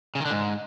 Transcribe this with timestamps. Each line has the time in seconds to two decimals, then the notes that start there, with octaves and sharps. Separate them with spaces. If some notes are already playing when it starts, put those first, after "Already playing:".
0.15 C#3
0.20 D#3
0.25 D3
0.31 G#2